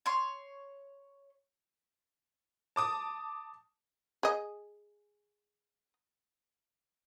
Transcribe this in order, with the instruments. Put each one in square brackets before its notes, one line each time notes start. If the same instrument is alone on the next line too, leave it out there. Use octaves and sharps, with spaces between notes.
[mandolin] C#5 C6
[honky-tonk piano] A5 D6 D#6
[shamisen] G#4 D#5